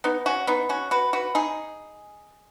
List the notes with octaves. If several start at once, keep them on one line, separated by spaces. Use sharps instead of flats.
B3 D#4
C#4 F#4
B3 D#4
C#4 F#4
F#4 B4
F#4 B4
D#4 G#4